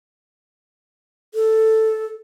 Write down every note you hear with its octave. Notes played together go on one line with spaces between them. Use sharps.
A4